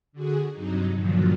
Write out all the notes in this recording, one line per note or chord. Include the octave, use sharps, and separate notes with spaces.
D3 F#4 G#4
G2 C3 F#3 D#4
G2 A#2 D3 D#3 F3 F#3